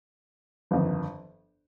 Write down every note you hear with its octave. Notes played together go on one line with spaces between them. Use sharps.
G1 F2 D#3